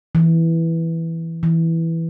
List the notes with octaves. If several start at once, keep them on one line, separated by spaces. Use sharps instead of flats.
E3
E3